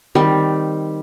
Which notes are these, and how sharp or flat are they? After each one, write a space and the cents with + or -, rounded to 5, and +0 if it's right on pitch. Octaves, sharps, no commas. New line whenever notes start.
D#3 +0 G3 +0 C4 -15